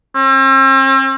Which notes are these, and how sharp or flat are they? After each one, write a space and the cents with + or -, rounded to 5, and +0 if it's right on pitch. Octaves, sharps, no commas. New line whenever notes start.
C4 +45